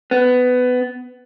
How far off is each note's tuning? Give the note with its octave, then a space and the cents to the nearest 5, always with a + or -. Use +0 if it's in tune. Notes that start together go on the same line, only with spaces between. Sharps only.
B3 +20